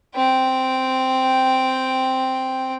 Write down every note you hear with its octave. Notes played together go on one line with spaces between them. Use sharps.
C4 G5